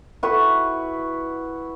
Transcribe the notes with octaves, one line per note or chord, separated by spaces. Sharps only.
E4 F#4 B4